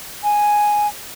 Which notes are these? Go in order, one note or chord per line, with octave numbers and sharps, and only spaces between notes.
G#5